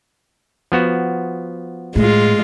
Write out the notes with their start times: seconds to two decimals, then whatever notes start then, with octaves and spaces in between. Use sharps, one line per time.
0.72 F3 B3 F#4
1.96 A2 G#3 F4